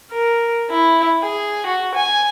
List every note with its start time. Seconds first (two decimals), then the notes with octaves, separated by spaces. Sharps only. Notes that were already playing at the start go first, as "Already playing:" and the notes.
0.11 A#4
0.71 E4
1.22 G#4
1.66 F#4
1.95 G#5